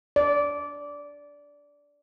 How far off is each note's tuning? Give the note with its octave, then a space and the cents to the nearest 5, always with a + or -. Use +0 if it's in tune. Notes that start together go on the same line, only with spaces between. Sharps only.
D5 -15